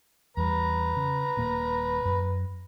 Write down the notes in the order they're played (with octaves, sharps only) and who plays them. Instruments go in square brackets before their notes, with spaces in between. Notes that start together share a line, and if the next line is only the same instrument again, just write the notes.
[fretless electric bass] E2 G3 [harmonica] B4 A#5
[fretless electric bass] C#3
D#1 A#2 A#3
F#2